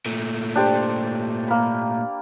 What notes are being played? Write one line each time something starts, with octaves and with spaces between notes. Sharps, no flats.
A#2 A3
D4 G4 C5
A#3 B5